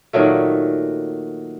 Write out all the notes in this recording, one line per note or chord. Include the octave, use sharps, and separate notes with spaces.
A#2 D#3 F#3 A3